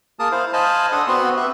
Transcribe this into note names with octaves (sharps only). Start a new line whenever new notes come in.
A#3 G#4 A#4 A5 D#6
E4 C5 F5
C5 D#5 F5 G#5 A5 B5
D4 A4 F#5 C6 D#6
B3 C4 F#4 B4 C6
G4 B4 E5